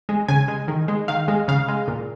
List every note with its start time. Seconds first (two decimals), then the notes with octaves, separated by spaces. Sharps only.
0.09 G#3
0.28 C#3 G#5
0.48 G#3
0.68 D#3
0.88 G#3
1.08 D#3 F5
1.28 G#3
1.48 C#3 F5
1.69 G#3
1.88 A#2